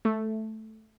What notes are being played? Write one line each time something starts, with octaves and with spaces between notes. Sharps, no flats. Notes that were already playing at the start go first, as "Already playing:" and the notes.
A3